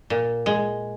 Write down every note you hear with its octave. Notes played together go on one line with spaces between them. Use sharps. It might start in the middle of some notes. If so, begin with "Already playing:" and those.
A#2
G#3